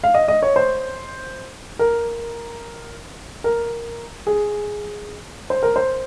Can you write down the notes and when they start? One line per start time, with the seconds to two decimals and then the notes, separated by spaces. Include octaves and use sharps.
0.04 F5
0.14 D#5
0.28 D#5
0.42 C#5
0.56 C5
1.79 A#4
3.44 A#4
4.27 G#4
5.50 C5
5.63 A#4
5.76 C5